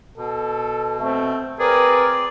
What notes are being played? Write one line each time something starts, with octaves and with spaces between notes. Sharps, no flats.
B2 A4
A3 C4
C4 G#4 A#4 B4 D5